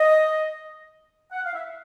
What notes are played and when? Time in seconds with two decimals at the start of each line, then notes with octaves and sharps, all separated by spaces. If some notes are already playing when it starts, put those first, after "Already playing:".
Already playing: D#5
1.32 F#5
1.44 F5
1.55 E5